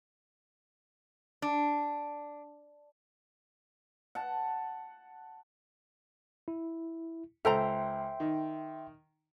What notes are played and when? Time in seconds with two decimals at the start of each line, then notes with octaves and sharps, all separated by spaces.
1.42 D4
4.15 F#5 A5
6.48 E4
7.45 C#2 A4 C5 E5 G5 A#5 C6
8.20 D#3